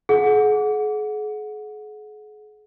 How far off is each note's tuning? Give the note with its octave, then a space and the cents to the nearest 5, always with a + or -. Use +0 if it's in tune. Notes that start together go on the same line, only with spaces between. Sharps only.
G#4 +40 F#5 -20